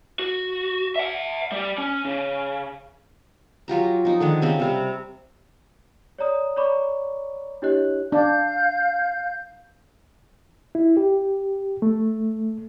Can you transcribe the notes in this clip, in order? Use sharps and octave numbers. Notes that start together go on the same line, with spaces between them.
F#4
E5 F#5
G3 G4
C#4
C#3
F#3 F4 G4 A#5
F3 D#4
D3 D#3 G#3
C#3 C4 G4
C3 G3 C4
C#5 D5 A#5 D#6
C#5 D5 A#5 B5 C#6 D6
D4 E4 G4 C#5 D#5 F#6
D4 F5 G6
E4
G4
A3